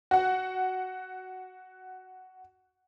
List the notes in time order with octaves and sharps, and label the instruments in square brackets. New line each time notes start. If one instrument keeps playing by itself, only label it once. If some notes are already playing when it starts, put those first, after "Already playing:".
[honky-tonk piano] F#4 F#5